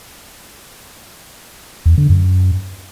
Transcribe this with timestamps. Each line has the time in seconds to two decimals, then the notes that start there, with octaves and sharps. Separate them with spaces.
1.86 E2
1.98 D3
2.10 F#2